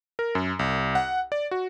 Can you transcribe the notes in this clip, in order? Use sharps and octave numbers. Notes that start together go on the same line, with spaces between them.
A#4
F#2
C2
F#5
D5
F#4